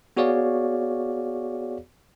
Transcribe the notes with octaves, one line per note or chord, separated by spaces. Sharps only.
B3 F#4 G#4 C#5 D5 F5